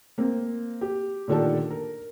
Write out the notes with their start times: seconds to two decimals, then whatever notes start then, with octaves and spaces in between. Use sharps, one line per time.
0.18 A#3 C4
0.81 G4
1.28 A#2 D3 D#3 D4 G4 A4
1.70 A#4